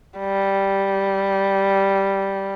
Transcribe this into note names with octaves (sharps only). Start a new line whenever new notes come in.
G3